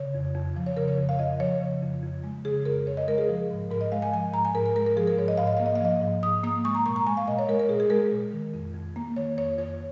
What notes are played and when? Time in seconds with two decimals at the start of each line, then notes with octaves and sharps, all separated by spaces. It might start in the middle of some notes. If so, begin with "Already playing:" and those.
Already playing: C#3 C#5
0.15 F2
0.35 F2
0.56 F3
0.66 C#5
0.77 C#3 A#4
0.88 C#5
0.98 F2
1.09 F5
1.19 F2 D#5
1.40 F3 C#5
1.61 C#3
1.82 F2
2.03 F2
2.24 G#3
2.45 C#3 G#4
2.65 F2 A#4
2.87 F2 C#5
2.97 D#5
3.08 G#3 A#4
3.18 G#4
3.29 F3
3.50 G#2
3.71 G#2 A#4
3.81 D#5
3.92 G#3 F5
4.02 G#5
4.13 F3 G#5
4.34 G#2 A#5
4.45 G#5
4.55 G#2 A#4
4.66 A#4
4.76 G#3 A#4
4.86 A#4
4.97 F3 G#4
5.07 A#4
5.18 G#2 C#5
5.28 D#5
5.37 G#2 F5
5.47 D#5
5.57 A#3 F5
5.66 D#5
5.75 F5
5.80 F3 D#5
6.02 G#2
6.22 G#2 D#6
6.43 A#3 D#6
6.64 G#3 C#6
6.75 A#5
6.86 A#2 C#6
6.96 A#5
7.07 G#3 G#5
7.17 F5
7.28 A#2 D#5
7.39 C#5
7.48 G#3 A#4
7.59 A#4
7.69 A#2 G#4
7.80 G#4
7.90 G#3 A#4
8.12 A#2
8.33 D#3
8.54 F2
8.74 F2
8.96 A#3
9.16 D#3 C#5
9.37 F2 C#5
9.58 F2 C#5